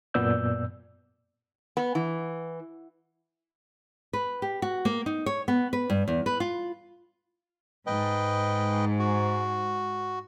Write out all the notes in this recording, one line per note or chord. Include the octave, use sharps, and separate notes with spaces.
F#2 A#2 B3 D5 E6 G6
B3
E3
B4
G4
F#4
A#3
D#4
C#5
B3
B4
G2
E2
B4
F4
G#2 B4 D#5 G5
F#4